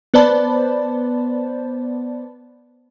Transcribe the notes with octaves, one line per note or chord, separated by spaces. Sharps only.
B3 B4 C5 D5 A5 B5